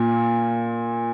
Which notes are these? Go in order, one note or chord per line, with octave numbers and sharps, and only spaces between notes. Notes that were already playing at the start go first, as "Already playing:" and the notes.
Already playing: A#2